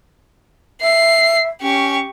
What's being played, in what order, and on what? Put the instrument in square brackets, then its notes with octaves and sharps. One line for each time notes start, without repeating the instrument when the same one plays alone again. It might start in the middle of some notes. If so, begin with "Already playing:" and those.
[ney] E5 [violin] C7
[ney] C#4 [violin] G4 C#6